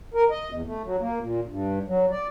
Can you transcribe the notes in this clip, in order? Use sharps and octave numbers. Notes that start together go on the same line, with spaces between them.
A#4
D#5
E2
A3
F#3
A#3
A#2
G2
F#3
D5